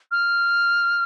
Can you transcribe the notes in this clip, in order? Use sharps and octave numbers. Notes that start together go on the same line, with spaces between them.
F6